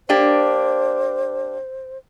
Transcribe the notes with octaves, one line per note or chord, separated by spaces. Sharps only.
A#3 D4 G4 C5